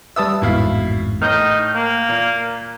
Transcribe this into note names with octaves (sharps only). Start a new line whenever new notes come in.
G3 B4 E5 A5 D#6 E6
A1 F2 G#2 B2 E4 F5
A2 D#4 F6 G6 A#6
A#3
A#2